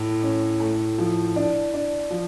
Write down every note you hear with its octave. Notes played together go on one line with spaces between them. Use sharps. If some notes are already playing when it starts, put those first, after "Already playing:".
Already playing: A2
C#4
A3
F3
D4
D4
F3